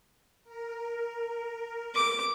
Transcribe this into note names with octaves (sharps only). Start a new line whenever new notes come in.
A#4
D6